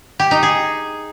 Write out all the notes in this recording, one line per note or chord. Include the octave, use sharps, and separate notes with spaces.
G4
D#4
G#4